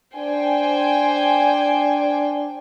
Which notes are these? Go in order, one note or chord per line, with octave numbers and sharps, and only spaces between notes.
D4 C5 G5 G#5